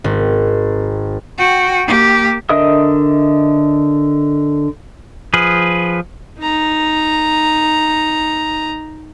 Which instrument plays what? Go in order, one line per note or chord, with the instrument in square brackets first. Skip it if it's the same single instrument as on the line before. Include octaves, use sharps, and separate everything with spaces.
[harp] G#1
[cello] F#4 G5
A#3 G4
[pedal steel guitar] D3 A#4 D#5 E5 D#6
F3 G#4 B4
[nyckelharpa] D#4 A#5